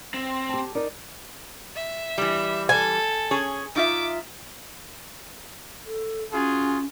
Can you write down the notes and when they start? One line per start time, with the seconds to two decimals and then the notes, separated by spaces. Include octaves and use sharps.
0.14 C4
0.49 G4 A5
0.75 D#4 A#4 D5
1.76 E5
2.18 E3 G3
2.69 A4 G#5
3.31 C#4 G#4 C#5
3.76 D#4 F4 E5 D6
5.86 A4
6.33 C#4 F4 F#4 G#4